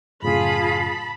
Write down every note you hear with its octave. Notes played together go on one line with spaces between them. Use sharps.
F#2 A2 C#3 F4 G#4 A5 B5